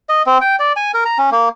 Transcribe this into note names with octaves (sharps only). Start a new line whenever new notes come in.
D#5
C4
G5
D5
G#5
A#4
A#5
C#4
A#3